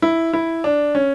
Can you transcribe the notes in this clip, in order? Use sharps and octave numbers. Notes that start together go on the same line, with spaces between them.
E4
E4
D4
C#4